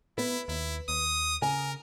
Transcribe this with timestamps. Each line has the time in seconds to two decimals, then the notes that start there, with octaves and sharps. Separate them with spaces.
0.18 B3 E4 B4
0.48 D#2 E4
0.89 D#2 D#6
1.42 C#3 A#4 G#5